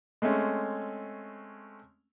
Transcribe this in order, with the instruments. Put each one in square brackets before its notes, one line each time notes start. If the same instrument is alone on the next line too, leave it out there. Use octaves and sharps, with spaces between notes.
[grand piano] G#3 A3 C4 C#4